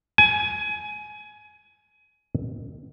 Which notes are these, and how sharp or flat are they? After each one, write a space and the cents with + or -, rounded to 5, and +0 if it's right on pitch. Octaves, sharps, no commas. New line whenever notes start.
G#5 +20